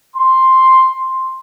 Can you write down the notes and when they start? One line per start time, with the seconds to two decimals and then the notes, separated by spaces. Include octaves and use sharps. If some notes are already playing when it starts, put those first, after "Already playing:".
0.17 C6
0.93 C6